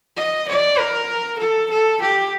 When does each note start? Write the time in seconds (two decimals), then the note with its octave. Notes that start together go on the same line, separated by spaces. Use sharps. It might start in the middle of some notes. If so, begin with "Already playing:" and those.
0.17 D#5
0.48 D5
0.79 A#4
1.39 A4
1.70 A4
2.02 G4